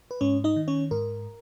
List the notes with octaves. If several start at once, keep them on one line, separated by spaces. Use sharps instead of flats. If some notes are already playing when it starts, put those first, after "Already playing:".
B4
G#2 C#4 C#5
D#4 D#5
D#3
C#4 C#5
G#2 A#4